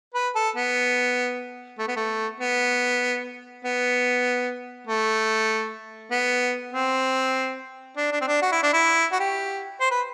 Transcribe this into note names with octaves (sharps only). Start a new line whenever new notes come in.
B4
A4
B3
A3
B3
A3
B3
B3
A3
B3
C4
D4
D4
C4
D4
F#4
E4
D4
E4
F#4
G4
C5
B4